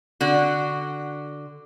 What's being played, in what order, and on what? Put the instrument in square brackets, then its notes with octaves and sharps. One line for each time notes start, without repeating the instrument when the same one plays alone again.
[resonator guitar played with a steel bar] D3 F#4